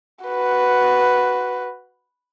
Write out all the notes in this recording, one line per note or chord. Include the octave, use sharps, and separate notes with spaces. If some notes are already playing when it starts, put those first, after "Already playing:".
F#4 B4